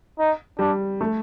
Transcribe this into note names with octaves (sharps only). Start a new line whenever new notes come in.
D#4
G3 D4
A3